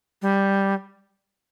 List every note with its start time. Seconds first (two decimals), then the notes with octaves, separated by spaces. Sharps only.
0.22 G3